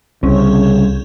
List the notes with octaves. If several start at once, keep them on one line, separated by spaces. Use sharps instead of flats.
C2 C#3 C4 C#4